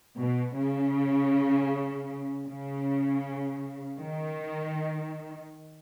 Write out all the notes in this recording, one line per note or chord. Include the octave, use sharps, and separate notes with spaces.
B2
C#3
C#3
D#3